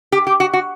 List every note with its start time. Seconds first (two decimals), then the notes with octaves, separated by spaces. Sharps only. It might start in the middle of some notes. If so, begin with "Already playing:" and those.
0.12 G4
0.27 G4
0.40 F#4
0.53 F#4